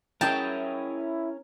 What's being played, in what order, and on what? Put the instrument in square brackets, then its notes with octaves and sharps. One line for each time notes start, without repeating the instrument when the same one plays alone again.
[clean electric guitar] C#4 A#4 [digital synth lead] E4 [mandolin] G#4 D#5 G5 [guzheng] A5